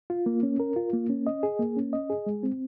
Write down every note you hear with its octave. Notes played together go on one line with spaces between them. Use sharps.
F4
A#3
C#4
A#4
F4
A#3
C#4
D#5
G#4
A#3
C#4
D#5
G#4
G#3
C4